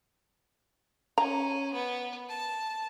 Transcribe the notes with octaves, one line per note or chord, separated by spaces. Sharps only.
C#4 A#5
B3
A5